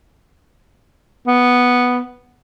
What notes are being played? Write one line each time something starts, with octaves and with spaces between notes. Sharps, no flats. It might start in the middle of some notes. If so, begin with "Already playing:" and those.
B3